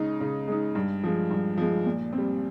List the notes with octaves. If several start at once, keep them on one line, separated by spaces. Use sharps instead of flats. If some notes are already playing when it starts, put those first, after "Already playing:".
Already playing: C#3 G#3 D#4
C#3
G#3 D#4
G2
F3 G#3
G2
F3 G#3
A#2
C4
G3